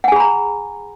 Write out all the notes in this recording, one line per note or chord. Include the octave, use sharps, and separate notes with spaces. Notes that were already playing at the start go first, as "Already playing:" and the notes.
G#4 F#5 G#5 A#5 B5